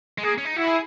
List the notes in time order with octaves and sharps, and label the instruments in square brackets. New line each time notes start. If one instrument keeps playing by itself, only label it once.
[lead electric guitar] G#3
[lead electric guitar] A#3 [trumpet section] G#4
[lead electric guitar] C#4
D#4
[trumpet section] E4 [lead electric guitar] F#4
[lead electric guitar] G#4